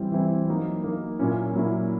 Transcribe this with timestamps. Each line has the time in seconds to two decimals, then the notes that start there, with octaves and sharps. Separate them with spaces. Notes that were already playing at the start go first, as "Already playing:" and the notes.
Already playing: E3 G3 C4 E4
0.12 E3 G3 C4 E4
0.47 F#3 A#3 D#4
0.84 F#3 A#3 D#4
1.19 A#2 F#3 A#3 C#4 E4
1.54 A#2 F#3 A#3 C#4 E4